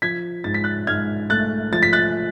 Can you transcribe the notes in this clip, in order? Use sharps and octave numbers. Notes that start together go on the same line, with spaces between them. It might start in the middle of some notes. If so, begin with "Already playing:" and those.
F3 G#6 B6
G#2 A6
B6
F#6 A6
G#2 F6 G#6
A3 F#6 A6
F3 A6
B6
F#6 A6